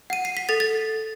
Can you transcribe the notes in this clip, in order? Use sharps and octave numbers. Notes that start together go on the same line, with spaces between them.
F#5 D#7
C7
B6
A4 A6
A6